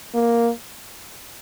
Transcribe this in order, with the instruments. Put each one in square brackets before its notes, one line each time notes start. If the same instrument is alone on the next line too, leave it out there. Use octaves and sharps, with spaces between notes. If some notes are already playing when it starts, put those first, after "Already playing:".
[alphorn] A#3